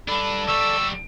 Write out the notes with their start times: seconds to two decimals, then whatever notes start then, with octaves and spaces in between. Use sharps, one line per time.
0.08 G2 D4 A4 D5 B5
0.48 D3 G3 C#6 E6